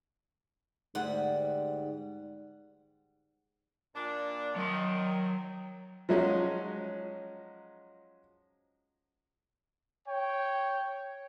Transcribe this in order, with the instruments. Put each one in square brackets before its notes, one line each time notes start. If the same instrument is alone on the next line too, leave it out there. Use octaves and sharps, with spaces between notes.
[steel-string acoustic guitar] D2 G3 F#5 [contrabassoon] G#2
[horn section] A#2 D4
[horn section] D#3 [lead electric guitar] F#3 C6
[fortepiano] F3 F#3 G#3 C#4 D#4
[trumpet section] C#5 G5